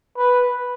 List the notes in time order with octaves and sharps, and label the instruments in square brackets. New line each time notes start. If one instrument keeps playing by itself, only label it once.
[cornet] B4